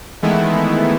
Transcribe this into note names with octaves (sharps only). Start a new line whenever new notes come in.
D#3 E3 G#3 A3 B3 E4